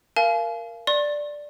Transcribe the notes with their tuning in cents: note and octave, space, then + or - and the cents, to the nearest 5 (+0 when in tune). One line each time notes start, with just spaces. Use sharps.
A#4 +0 F5 -25 G#5 +45
D5 +0 C6 +45